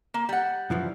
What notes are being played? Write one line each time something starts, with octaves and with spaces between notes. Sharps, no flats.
A#3
G3 F#5
F#2 E3 F3